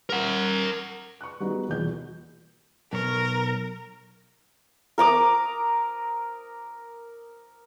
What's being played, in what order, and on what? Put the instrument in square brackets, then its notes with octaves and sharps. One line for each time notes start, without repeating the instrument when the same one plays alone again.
[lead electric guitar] A#4 F#5
[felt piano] C#6 F#6
G3 B3 D#4 F#4 G#4
D#1 E2 B2 G6
[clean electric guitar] B1 C#5 [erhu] A#4
[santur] A#4 A#5 D6 D#6